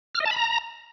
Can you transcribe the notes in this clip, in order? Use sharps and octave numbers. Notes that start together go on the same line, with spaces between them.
F6
D#5
A5
B5
A#5